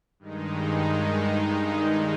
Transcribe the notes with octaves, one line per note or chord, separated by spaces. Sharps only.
G2 D#3 G#3 D#4